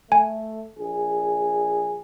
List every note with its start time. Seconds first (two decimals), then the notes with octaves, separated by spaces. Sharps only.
0.12 A3 G#5
0.78 A#1 G#4